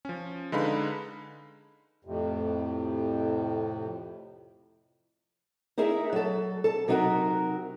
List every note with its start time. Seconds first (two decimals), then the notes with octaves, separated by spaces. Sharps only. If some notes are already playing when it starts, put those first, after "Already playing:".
0.05 F3 C#4
0.52 D3 G#3 D#4 B4 F5 B5
2.05 F2 A2 C3
5.78 D#4 E4 G#4 A#4 E5
6.13 F#3 A4
6.64 A4 A5
6.88 C3 F#3 D#4 F#4 G4 A#4